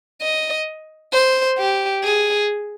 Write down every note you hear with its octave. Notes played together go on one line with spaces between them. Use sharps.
D#5
C5
G4
G#4